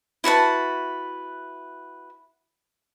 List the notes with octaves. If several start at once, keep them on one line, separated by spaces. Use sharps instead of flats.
E4 F#4 B4 A5